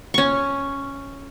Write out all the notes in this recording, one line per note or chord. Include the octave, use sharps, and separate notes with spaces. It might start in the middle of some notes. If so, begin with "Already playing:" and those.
C#4 C#6